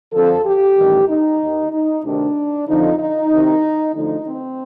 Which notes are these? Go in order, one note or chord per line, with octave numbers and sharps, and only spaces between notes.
F2 D3 F3 A4
G4
A1 G2 D#3
D#4
D#2 D#3
D#4
D2 C3 D#3 D4
F2 D3 F3 D#4
D#4
C2 C3 D#3
D2 D3 F3 D#4
C4